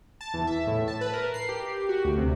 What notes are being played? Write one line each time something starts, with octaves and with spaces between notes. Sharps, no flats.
A5
E2
E5
A2
A5
B4
A#4
C7
G4
F#4
D2
C3